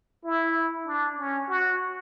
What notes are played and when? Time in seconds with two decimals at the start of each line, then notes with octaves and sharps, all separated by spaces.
0.24 E4
0.87 D4
1.19 C#4
1.49 F#4